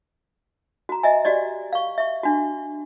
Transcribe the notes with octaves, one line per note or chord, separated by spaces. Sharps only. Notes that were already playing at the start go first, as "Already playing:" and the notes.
F#4 A#5
D#5 E5 G#5
F#4 G4 D5 D#5
F5 C#6
E5 C#6
D4 F#4